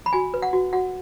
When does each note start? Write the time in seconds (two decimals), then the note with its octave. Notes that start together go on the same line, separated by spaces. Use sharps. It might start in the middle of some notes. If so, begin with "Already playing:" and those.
0.06 B5
0.13 F#4 G#5
0.34 B4
0.42 F#5
0.53 F#4
0.73 F#4 F#5